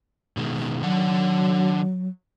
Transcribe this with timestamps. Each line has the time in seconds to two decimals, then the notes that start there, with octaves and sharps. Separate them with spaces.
0.37 B2 D#3 G#3
0.82 D#3 F#3 D4 F#5